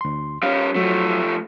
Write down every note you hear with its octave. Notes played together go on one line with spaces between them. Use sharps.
D2 C6
G3 C#4 F5
F3 F#3 A3